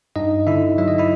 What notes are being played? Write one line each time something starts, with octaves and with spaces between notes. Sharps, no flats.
G2 D#4 D#5
D3 E4 E5
F#3 E5
D#5
E4 E5